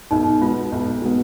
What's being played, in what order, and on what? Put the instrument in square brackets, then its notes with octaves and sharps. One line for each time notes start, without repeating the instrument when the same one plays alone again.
[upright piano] B1 [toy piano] D#4
[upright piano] B2 G#3 B3 [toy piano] F4
[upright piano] B1
B2 G#3 B3